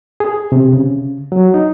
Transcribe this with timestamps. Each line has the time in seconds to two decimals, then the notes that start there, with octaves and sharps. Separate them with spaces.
0.20 G#4
0.52 C3
0.73 C#3
1.32 F#3
1.54 D#4